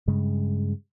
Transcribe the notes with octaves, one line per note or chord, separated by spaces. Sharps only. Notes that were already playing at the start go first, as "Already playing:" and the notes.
G2 C#3 G#3